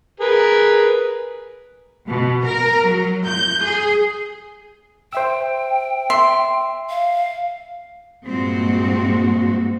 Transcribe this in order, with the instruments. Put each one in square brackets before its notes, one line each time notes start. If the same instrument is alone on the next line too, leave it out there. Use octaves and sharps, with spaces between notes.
[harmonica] G#4 A#4 B4
[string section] B2
A#4
F#3
G6
G#4
[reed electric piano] C5 E5 E6 [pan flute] G5
[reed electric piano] E5 [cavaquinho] C6
[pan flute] F5
[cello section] G2 A#2 G#3 C4 F#4